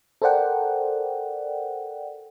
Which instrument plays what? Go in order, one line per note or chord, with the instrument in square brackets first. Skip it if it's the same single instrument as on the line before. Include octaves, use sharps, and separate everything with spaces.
[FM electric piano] A4 A#4 C5 D5 F#5 G5